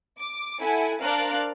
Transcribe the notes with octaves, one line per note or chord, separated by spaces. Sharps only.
D6
E4 A4 F#5 G#5
D4 A#4 C5 D5 F5 F#6